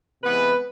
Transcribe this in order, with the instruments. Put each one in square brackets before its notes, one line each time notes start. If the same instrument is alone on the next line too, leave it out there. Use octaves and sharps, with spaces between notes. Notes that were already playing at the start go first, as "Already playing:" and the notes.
[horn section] C3 E3 G#3 B3 B4